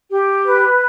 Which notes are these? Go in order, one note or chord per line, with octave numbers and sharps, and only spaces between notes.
G4
B4